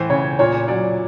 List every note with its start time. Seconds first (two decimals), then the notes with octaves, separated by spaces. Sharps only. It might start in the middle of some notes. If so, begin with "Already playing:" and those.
Already playing: A2 E3 C5
0.10 C#3 C#5
0.39 A#2 C#5
0.68 F#3 D5